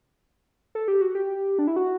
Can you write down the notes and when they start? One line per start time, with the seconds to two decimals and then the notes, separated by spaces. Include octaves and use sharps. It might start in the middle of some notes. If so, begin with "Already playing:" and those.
0.75 A4
0.88 G4
1.01 F#4
1.15 G4
1.59 D4
1.67 E4
1.76 F#4